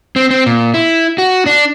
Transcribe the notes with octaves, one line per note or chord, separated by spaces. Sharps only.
C4
C4
A#2
E4
F#4
D4